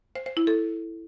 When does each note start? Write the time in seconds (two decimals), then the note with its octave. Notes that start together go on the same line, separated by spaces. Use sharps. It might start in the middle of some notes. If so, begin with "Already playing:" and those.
0.16 C5
0.26 C5
0.37 E4
0.47 A4